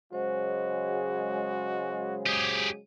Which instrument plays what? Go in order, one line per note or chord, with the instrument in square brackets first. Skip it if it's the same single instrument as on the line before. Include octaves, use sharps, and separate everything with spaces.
[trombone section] C#3 F#3 G#3 [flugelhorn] F#4 [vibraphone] C5
[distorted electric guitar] G4 G#4